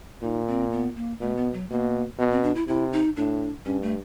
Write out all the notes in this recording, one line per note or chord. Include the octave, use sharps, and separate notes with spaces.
A#2 D#4
C4
B3
A#3
B2 A3
B3
F#3
B2 A#3
B2 B3
C4
D4
E4
C3 E4
D#4
A2 D4
G2 C#4
A3